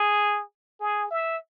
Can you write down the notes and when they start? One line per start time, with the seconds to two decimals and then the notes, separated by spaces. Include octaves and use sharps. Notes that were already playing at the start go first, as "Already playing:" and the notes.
Already playing: G#4
0.80 G#4
1.11 E5